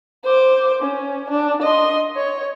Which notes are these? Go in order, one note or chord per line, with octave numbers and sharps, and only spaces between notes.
C5 D6
C#4
D4
D#5 C6
C#5